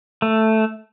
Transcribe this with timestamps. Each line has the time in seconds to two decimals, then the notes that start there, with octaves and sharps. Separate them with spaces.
0.22 A3